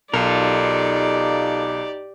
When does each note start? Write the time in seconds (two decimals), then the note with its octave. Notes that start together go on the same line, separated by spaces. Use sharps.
0.14 B1 D#4 F4 G4 A4 A#4 D5